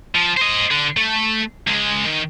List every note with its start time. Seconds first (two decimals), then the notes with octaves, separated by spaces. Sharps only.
0.15 F3
0.37 C5 D#5
0.71 D3
0.97 A3
1.67 C#2 G#3
2.05 D#3